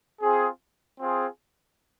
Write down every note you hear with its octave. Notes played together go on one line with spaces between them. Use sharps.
C4 F4 G#4
C4 F4 G#4